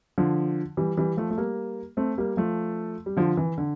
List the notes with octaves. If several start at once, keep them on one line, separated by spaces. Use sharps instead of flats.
D3 F3
E3 G3
E3 G3
F3 A3
A3
G3 A#3
A3 C4
G3 A#3
F3 A3
G3
D3 F3
E3
D3